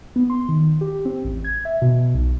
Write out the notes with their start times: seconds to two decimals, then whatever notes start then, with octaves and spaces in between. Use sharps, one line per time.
0.16 B3
0.30 C6
0.49 D#3
0.81 G4
1.05 C4
1.25 A1
1.44 G#6
1.65 E5
1.82 B2
2.14 B1